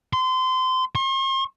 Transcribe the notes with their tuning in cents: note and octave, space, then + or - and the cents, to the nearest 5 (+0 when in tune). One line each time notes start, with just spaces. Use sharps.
C6 -25
C6 +45